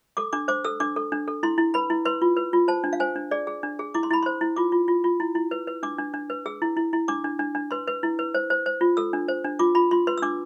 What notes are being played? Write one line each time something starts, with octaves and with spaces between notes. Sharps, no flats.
A4 D6
D4 D6
C5 D6
A4 E6
D4 D6
A4
D4
A4
E4 C6
E4
B4 B5
E4
B4 C6
F4
B4
F4
C5 A5
D4
F5
C5 G#5
D4
G#4 D5
G#4
D4
G#4
E4 D6
C6
E4 B5
C5 C6
E4
F4 D6
F4
F4
F4
E4
E4
B4
B4
D4 D6
D4
D4
B4
G#4 E6
E4
E4
E4
D4 D6
D4
D4
D4
B4 C6
B4
E4
B4
C5
C5
C5
F4
A4 E6
D4
C5
D4
F4 D6
F4 B5
F4 C6
B4 C6
E6
D4 D6